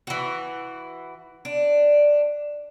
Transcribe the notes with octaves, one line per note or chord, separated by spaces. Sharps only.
E3 F#4
D4